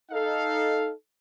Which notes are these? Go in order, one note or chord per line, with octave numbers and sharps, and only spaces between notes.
D#4 A4 F5